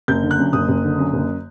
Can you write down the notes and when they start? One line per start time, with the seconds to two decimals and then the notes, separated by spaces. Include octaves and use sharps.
0.08 F#1 G6
0.23 D3
0.31 F#6
0.39 F#2
0.53 F#1 D#6
0.68 F#1
0.83 D3
0.99 F#2
1.13 F#1